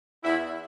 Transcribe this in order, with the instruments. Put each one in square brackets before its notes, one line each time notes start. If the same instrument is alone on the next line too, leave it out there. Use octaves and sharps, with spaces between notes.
[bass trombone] E2 [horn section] E4